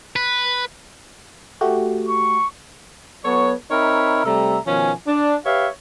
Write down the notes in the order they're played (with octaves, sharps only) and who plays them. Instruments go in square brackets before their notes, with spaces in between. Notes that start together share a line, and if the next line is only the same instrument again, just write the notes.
[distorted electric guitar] B4
[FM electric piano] A3 F#4 G4
[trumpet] C#6
[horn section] F#3 B3 A4 C#5
C4 D#4 A#4 C#5 E5 B5
C3 G3 A3 A4 E5 A#5
B2 D#3 F3 C#4 G#5
D4
G4 B4 C#5 E5 F5